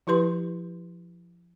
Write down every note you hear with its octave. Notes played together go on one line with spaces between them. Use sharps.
F3 E4 G4 B4 C6